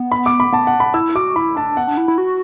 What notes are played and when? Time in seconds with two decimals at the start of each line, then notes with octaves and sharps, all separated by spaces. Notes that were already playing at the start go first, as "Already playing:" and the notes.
Already playing: B3
0.12 B5
0.26 D6
0.40 B5
0.53 B3 A5
0.67 F#5
0.80 B5
0.94 E4 E6
1.15 F#4 D6
1.36 E4 B5
1.56 D4 A5
1.77 B3 F#5
1.88 D4
1.97 E4
2.08 E4
2.18 F#4